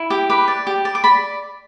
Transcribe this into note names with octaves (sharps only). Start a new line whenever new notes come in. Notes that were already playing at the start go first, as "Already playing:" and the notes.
Already playing: E4
G4
B4 D6
D5
G4
D5
D6
D5 B5